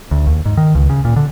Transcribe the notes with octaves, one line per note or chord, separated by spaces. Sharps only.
D2
D#2
G#2
D#3
C#2
C#3
A#2
D3